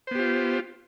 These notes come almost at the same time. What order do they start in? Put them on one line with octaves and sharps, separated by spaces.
C5 B3 G4 F4